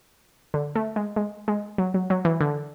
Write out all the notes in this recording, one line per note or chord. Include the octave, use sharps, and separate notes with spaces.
D3
A3
G#3
G#3
G#3
F#3
F#3
F#3
E3
D3